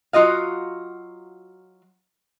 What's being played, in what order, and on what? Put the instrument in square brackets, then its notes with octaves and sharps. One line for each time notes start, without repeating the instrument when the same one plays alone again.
[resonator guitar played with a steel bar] F#3 F4 F#4 D#5 F5